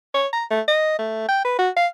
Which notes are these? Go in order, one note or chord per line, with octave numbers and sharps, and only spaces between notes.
C#5
A#5
A3
D#5
A3
G5
B4
F#4
F5